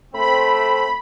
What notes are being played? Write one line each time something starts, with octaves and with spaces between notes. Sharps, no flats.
A3 C4 B5